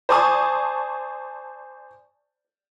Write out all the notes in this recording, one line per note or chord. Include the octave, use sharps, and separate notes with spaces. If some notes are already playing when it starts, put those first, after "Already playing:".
C5 D5 G#5 A5 C#6 D#6